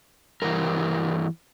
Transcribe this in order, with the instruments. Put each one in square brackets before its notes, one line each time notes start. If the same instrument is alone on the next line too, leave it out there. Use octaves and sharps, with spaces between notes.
[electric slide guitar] G2 E3 G3 A#4